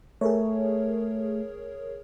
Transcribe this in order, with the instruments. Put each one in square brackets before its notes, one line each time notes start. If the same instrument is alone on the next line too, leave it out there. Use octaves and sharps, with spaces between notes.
[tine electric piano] A3 [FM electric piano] G#4 A#4 C#5